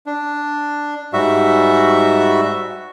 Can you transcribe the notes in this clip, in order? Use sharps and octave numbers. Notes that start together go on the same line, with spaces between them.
D4
G#2 G3 F#4 E5